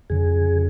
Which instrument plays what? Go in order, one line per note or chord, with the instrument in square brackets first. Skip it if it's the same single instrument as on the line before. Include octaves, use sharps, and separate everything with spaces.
[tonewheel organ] F2 C#3 G#4